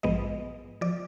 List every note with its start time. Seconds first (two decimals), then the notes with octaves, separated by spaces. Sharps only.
0.03 A#1 G#2 F3 G#3 B3 D#5
0.81 F3 D5